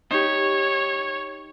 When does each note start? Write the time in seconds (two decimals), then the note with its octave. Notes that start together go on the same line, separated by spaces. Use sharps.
0.11 D#4 G4 C#5